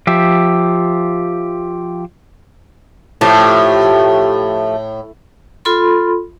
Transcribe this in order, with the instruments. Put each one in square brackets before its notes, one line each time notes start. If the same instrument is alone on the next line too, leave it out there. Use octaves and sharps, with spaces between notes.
[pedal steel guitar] F3 G4 E5
[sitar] A2 [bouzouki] F3 A3 G4
[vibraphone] F4 A4 B5 C6